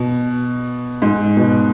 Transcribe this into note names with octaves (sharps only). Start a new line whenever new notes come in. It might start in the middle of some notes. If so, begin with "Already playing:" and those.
Already playing: B2
G#2
B2